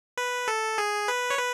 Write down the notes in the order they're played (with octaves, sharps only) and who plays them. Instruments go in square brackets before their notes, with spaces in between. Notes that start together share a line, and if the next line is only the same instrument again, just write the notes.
[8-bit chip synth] B4
A4
G#4
B4
C#5
B4